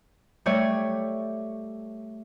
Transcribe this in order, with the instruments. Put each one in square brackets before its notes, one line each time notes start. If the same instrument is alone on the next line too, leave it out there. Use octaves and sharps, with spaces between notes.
[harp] G3 A3 C#5 D5